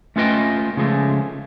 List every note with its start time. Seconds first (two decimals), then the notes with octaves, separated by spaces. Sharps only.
0.16 A3 C#4 F4 B4 D#5 G5
0.77 C#3 F3 G#3 A3